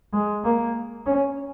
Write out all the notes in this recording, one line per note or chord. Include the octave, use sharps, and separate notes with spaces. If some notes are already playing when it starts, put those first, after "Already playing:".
G#3
A#3
C#4